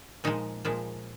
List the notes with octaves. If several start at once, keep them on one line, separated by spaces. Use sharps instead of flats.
A#2 F3 G#3 D#4
A#2 F3 G#3